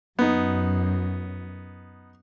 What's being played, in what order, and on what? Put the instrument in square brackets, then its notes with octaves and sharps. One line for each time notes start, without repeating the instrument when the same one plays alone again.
[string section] F#2 [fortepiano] B3 D#4